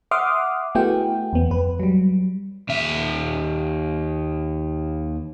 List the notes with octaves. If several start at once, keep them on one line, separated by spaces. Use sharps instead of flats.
E5 F#5 C6 D6 D#6 F6
A3 B3 E4 F#4 G#4 G5
E2 B3
F2 B4
F#3 G3
D#2 E5